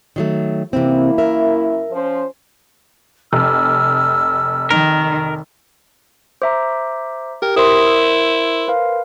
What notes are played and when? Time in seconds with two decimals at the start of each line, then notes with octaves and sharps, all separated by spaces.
0.16 D#3 F#3 A3
0.73 F#2 C3 E3 A#3 C4 E4
1.18 A#4 E5
1.91 F3 C#4 C5
3.33 F1 E6 F6
4.71 D#3 A#4
6.42 C5 E5 A#5 D6
7.42 G4 A#4 G5
7.56 E4 A#4 C5 C6 D#6
7.87 E6
8.68 B4 F5